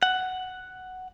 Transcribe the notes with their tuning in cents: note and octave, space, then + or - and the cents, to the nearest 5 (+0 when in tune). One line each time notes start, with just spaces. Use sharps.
F#5 +5